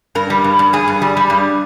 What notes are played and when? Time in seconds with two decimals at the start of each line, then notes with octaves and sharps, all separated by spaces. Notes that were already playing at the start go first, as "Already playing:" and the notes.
0.15 G2 A#4
0.30 G3
0.44 G2
0.59 G2
0.73 G2 G#4
0.88 G2
1.02 G3
1.17 G3
1.30 G2